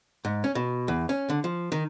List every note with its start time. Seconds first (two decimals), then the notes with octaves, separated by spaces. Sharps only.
0.25 G#2
0.44 C#4
0.55 B2
0.88 E2
1.09 C#4
1.30 D3
1.44 F3
1.72 D#3